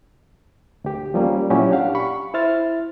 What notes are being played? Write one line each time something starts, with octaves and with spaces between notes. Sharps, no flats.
D2 G4
F3 G3 A#3 C#4
A#2 F#3 C#4 E4 F#4 G4
D4 G4 F5 F#5
B5 C#6
E4 C5 E5 F6 A6